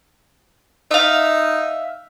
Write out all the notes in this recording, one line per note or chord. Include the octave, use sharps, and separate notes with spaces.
D#4 E5 F5